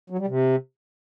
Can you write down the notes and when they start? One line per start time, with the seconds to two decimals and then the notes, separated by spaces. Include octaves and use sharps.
0.10 F#3
0.19 G3
0.27 C3